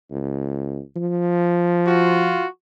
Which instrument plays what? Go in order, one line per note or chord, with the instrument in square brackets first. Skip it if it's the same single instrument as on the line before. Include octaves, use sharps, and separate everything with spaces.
[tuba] C#2
F3
[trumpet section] F4 F#4